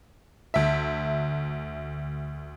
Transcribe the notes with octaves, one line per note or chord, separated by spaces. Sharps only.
D2 E5